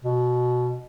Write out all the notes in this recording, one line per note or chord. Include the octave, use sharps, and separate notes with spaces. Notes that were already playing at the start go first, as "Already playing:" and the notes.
B2